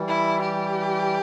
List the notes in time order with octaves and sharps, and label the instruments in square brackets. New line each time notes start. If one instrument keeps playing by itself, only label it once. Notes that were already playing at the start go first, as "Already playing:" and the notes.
Already playing: [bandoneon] E3 G3
[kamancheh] E4
G4